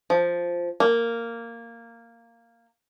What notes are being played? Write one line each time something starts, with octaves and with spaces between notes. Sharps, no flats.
F3
A#3